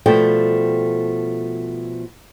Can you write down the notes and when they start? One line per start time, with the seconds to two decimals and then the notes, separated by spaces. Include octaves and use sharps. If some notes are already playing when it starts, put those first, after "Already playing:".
0.06 B2 F3 G3 A3 G5